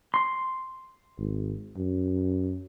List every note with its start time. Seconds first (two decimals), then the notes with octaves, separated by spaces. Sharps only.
0.14 C6
1.18 G#1
1.77 F#2